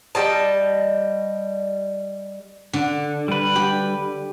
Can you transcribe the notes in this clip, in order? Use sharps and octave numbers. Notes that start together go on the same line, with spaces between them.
G3 D#5 A5
D3
G3 B4
G4